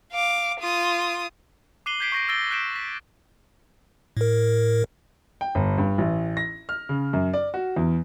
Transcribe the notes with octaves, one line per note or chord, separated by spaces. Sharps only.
F5 D6
F4 D#6
D6 F#6 C7 D#7 F#7 G7
G6 G#6 B6 C7 D7
C#6 G6 A#6 C7 D7
E6 G6 A6 A#6 D7 G7
F#6 G6 B6 D7 E7
B6
A2 A#4
G5
G1
G2
A1
A#6
F6
C#3
F#2
D5
F#4
E2